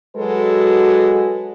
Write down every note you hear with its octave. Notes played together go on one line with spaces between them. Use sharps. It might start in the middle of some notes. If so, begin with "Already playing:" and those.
F#3 G#3 F#4 A4 B4